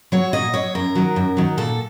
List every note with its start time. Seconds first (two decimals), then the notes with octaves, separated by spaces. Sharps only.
0.12 F#3 C#5
0.33 A#2 D#5
0.54 F#3 C#5
0.75 F#2 A#4
0.95 D#3 F#3
1.16 F#2
1.37 D#3 F#3
1.58 A#2 A4